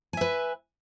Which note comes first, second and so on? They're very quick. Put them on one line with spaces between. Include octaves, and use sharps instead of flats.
G#5 E5 B4